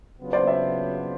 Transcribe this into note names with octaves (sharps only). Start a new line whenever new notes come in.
C#3 F#3 B3 D4 F4
C5 D5
D5 E5